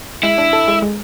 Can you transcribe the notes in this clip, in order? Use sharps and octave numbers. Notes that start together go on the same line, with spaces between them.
G#3 E4
D4
A4
G#3
G#3